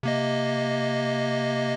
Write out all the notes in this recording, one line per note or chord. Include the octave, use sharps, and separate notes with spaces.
C3 A#3 D#5